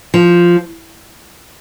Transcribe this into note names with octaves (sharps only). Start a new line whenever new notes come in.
F3